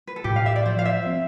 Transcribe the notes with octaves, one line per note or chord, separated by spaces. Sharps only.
B4
A4
A2 G4
F5
E5
D5
F3 C5
F5
E5
C4